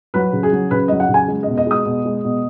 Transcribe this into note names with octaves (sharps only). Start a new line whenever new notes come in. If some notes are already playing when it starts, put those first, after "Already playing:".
F#3 B4
C#3
G#4
F#3
C#3 B4
F#3 D#5
F#5
C#3
G#5
G#3
D#5
B2
D#5
G#3 D#6
B2
G#3
B2